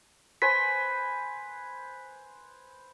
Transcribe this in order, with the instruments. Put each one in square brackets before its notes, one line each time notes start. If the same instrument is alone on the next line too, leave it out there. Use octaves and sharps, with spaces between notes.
[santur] B4 C5 G#5 [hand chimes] B6